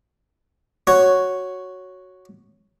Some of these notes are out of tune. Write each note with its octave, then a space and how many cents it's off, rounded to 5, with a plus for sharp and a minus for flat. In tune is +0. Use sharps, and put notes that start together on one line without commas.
F#4 +0 C#5 +0